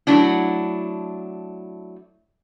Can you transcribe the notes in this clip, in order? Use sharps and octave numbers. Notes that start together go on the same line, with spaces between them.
F#3 A3 D4 E4